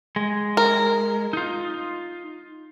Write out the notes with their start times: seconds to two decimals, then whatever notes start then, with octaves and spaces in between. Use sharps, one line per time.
0.16 G#3
0.57 A#4
1.33 D#4 F4